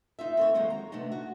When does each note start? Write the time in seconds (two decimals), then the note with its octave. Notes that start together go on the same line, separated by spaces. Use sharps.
0.19 D#4 F4 E5
0.37 C4 A4 C#5
0.54 D#3 F#3 G#3 A#3 C5 C#5
0.70 A#5
0.92 C3 A3 B3 D4 D#4
1.12 F#4